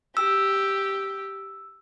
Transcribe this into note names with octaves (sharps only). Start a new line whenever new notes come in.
G4 E6